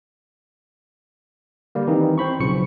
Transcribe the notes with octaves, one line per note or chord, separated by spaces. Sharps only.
D3 G3 A#3
D#3 E3 C4 D#4 G4
C4 C5 B5 C#6
B1 C#3 F3 C#6 C#7